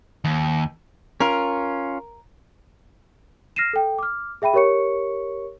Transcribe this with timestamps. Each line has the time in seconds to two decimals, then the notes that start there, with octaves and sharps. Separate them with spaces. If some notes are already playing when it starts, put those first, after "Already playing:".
0.25 D#2
1.20 C#4 F4 A#4
3.56 F6 A#6 C7 D#7 E7
3.73 A4 G5
3.99 D6 F6
4.42 G#4 E5 G5 B5 D#7
4.54 G4 A#4 C#5 C#6 C#7